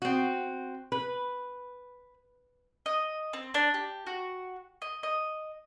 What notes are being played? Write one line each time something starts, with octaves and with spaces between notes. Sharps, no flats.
C4 F#4
B4
D#5
C4
D4
G4
F#4
D#5
D#5